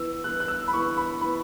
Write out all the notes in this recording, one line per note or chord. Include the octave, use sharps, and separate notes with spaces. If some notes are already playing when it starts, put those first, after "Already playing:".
Already playing: E3 B3 E6
E3 B3 F#6
F#6
E6
B5
E3 B3 C#6
B5
E3 B3 B5